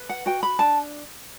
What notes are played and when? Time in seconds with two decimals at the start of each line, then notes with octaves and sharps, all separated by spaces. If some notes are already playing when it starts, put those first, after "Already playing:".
Already playing: B4
0.09 F#5
0.26 F#4 G5
0.43 B5
0.59 D4 A5